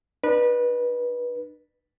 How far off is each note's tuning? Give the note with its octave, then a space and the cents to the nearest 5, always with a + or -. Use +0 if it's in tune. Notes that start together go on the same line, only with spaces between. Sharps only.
D4 +45 B4 -20